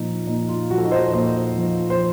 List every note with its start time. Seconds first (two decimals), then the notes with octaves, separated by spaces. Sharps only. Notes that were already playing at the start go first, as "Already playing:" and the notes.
Already playing: A#2 F3 D#4
0.27 A#2 D#4
0.49 F4
0.70 F3 F#4
0.78 A4
0.84 D#4 F#4
0.91 C5 D#5
1.13 A#2 C5 D#5
1.56 F3
1.90 C5